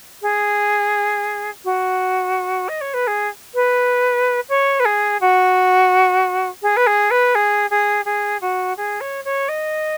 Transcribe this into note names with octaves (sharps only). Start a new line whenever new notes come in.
G#4
F#4
D#5
C#5
B4
G#4
B4
C#5
B4
G#4
F#4
G#4
B4
G#4
B4
G#4
G#4
G#4
F#4
G#4
C#5
C#5
D#5